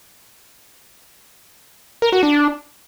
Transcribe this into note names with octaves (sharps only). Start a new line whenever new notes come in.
A#4
F#4
D4